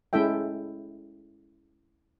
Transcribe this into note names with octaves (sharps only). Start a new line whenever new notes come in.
G#3 C#4 E4 A4 E5 G5